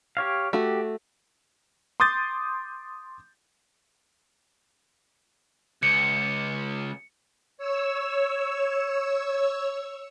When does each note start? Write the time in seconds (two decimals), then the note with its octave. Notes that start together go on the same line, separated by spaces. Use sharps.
0.17 G4 C#5 F5
0.53 A3 F#4 G4
2.00 C6 D6 D#6 G6 A6
5.83 C#2 C#7
7.57 C#5 E6